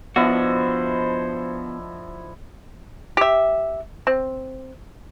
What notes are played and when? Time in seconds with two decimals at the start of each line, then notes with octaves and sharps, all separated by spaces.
0.16 F3 B3 D4 E4 F#4 C5 D#5
3.17 G4 E5
4.07 C4